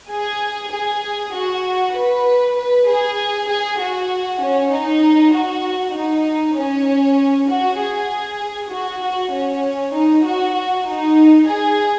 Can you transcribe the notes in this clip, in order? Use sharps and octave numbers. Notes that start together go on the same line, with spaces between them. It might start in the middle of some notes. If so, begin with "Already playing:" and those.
G#4
G#4
F#4
B4
B4
G#4
G#4
F#4
C#4
D#4
F#4
D#4
C#4
F#4
G#4
F#4
F#4
C#4
D#4
F#4
F#4
D#4
G#4